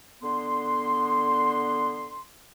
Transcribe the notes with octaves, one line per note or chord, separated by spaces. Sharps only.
D3 B3 C6